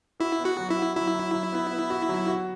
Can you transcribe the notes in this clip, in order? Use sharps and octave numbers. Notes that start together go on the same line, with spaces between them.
E4 F#4
B3
F#4
F#3
E4
F#4
F#3 E4
F#3
F#3
B3
B3
F#4
F#3
F#4